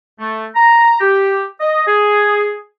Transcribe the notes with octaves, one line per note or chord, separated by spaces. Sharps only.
A3
A#5
G4
D#5
G#4